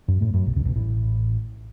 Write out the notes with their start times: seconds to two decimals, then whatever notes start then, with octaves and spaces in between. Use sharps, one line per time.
0.08 F#2
0.21 A2 A3
0.33 F#2 F#3
0.46 B1 B2
0.56 C#2 C#3
0.65 B1 B2
0.75 A1 A2